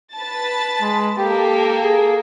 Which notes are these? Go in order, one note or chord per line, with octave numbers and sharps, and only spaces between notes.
B4 A5 A6
G#3
A#3 G4 A4
G#4